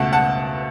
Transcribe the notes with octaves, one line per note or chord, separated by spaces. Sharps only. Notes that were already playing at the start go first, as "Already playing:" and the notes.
Already playing: C#2 B2 A3 F#5 A5
F#5 A5